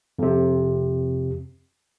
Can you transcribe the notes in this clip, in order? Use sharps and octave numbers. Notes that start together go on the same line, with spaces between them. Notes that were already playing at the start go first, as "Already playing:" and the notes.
F2 C3